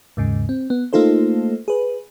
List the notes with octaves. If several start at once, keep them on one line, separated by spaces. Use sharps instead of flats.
D#2 G#2 C#3
C4
B3
A3 A#3 D#4 F4 A4 C5
G#4 B4